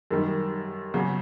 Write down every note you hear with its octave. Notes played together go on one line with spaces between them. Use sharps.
F#2 D#3 G3
E2 C#3 F#3